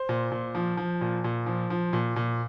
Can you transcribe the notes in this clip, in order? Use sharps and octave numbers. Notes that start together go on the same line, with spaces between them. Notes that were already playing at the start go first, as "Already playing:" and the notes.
Already playing: C5
A#2
A#2
F3
F3
A#2
A#2
F3
F3
A#2
A#2